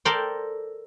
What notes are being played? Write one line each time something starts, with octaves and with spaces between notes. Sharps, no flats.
A4 A#4 C5 D5 G5